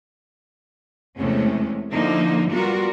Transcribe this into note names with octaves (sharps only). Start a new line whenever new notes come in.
E2 C3 G#3 A3 C#4
D3 F3 A#3 D#4 E4
G3 B3 F4 F#4 A#4